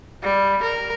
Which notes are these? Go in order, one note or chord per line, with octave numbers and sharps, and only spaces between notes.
G3
A#4